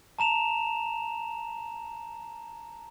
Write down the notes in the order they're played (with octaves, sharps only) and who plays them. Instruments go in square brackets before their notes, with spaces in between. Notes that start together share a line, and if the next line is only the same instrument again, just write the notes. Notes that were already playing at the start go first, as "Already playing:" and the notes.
[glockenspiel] A5 A#5 E7 F7